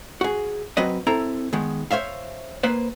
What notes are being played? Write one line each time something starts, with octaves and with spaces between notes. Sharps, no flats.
F#4 G#4
F#3 C4 B4 D#5
C4 E4 A4 A#5
D#3 G#3 B3
C5 C#5 E5 F5
A#3 B4 C5